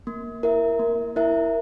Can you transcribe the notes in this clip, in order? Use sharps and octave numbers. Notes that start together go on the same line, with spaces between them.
A#3
E4 A#4 E5
A#3
E4 A#4 E5